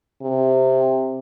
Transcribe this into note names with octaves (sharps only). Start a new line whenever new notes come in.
C3